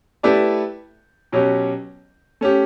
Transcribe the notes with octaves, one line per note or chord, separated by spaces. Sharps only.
A3 E4 G4 B4 D5
B2 F#3 C#4 G4
A3 C#4 G4